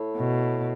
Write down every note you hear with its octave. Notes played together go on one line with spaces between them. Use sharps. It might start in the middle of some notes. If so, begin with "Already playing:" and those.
Already playing: A2
B2